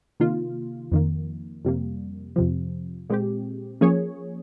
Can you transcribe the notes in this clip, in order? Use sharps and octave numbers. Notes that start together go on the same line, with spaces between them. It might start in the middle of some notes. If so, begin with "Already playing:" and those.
C3 D#3 A#3 F4
F2 D#3 A#3
F2 C3 G3 A#3
F2 C3 F3
A#2 G#3 C4 G4
F3 A#3 C#4 G#4 C#5